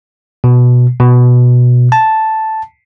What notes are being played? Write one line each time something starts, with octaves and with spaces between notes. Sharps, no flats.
B2
B2
A5